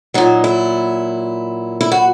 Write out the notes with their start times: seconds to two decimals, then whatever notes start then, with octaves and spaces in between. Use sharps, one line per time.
0.14 A#2 F#3 D#4
0.44 E4
1.81 E4
1.92 F#4